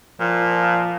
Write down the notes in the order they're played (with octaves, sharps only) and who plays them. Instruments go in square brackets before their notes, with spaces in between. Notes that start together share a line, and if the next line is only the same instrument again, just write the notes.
[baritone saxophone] A#2 [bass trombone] F3